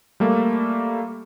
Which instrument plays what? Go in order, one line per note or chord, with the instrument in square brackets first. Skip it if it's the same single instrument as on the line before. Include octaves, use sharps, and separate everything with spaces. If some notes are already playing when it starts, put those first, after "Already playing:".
[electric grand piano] G3 A3 A#3